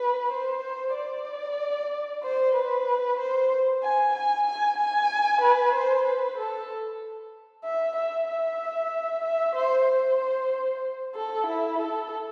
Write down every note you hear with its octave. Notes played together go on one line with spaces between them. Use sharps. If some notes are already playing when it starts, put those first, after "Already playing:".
Already playing: B4
C5
D5
C5
B4
C5
G#5
G#5
G#5
G#5
B4
C5
B4
A4
E5
E5
E5
E5
C5
C5
A4
E4
A4